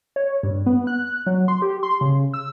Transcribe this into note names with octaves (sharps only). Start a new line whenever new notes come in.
C#5
G2
B3
F#6
F#3
C6
G4
C6
C#3
E6